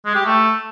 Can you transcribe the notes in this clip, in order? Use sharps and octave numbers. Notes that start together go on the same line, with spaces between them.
G#3
G4
A3